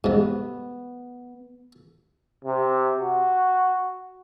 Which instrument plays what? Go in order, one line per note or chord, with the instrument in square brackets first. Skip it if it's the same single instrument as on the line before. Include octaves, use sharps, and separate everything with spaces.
[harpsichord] G#2 C3 [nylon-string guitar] B3
[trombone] C3
F#4